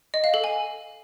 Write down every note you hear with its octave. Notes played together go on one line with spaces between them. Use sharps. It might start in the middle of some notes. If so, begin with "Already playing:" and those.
D#5
F5
A4
G#5